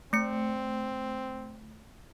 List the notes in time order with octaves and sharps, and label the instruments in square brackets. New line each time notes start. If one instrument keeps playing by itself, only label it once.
[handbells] A3 C#7 [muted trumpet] C4